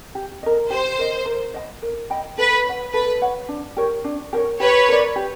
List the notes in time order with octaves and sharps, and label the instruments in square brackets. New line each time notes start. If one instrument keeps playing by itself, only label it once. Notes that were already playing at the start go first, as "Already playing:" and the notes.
[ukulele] G4
A#4 D#5
[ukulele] G4 [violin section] C5
[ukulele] A#4 D#5
A#4
D#5 G5 B5
A#4
D#5 G5 B5
[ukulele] A4 [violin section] B4
[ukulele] C#5 F#5
[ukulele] A4 [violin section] B4
[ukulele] C#5 F#5
D4
G4 A#4 C#5
D4
G4 A#4 C#5
[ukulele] G4 [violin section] B4 C#5
[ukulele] A#4 D5
G4